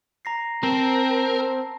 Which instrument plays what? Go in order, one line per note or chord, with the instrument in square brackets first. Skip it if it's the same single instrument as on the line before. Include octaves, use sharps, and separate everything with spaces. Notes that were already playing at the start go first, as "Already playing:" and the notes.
[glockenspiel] A#5 A#6 C7
[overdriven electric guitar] C4 [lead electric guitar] A#4 [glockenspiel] A5